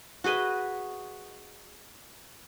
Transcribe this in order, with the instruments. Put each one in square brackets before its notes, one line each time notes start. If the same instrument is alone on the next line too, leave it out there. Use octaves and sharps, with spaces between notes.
[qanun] F#4 G#4 B4 D#5